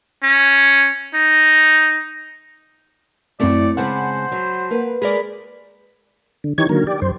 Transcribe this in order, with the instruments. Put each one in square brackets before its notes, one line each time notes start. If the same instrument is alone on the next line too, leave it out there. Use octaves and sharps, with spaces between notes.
[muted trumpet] C#4
D#4
[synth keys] F#2 C4 E4 [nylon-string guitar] A3 C#5 [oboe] D5
[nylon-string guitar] C#3 G#3 C4 [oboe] C5 [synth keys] F#5 A5 B5
[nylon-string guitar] F#3
A#3 B4
[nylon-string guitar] G#3 [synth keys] G#4 A#4 D5 [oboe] B5
[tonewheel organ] D3
D#3 E3 D#4 G4 C#5 G#6
D3 D#3 F#3 A#3 A#4
G4 D5
F#2 C5